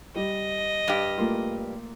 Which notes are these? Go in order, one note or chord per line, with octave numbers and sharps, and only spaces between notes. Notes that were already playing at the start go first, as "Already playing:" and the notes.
G3 D#5
G2 G4
A3 A#3 F4